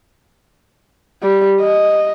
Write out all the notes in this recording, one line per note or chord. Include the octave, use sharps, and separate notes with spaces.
G3
D#5